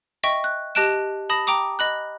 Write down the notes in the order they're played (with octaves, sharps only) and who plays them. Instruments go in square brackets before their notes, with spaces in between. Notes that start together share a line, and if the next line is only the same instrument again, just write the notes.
[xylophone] D#5 E5 G5 C#6
F#6
G4 D#5 A5 F#6 D7 E7
A5 B5 D#6 A#6
G5 A#5 D6 D#6
D#5 B5 F#6